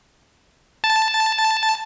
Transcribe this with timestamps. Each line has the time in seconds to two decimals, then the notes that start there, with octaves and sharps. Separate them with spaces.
0.84 A5